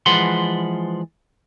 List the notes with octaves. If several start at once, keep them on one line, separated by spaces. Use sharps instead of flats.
E3 F3 G#3 B4 F#5 C6